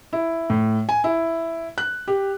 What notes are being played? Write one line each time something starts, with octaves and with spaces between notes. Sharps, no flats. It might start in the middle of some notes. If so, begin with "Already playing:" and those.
E4
A2
G#5
E4
F#6
G4